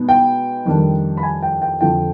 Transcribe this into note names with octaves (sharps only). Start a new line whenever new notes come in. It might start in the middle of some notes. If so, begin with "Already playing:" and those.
Already playing: B2 G#3 B3 D#4
G5
F2 D#3 G3 D4
B5
G#5
G5
G5
F2 D3 F3 G5